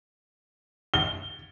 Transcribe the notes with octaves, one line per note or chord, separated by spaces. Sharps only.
G7